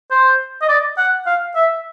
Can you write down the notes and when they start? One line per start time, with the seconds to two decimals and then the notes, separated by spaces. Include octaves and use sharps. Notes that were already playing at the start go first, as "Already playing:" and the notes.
0.11 C5
0.62 D#5
0.69 D5
0.98 F#5
1.26 F5
1.55 E5